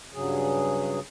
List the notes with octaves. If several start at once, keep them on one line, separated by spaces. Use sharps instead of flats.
G2 C#3 F#3 G#4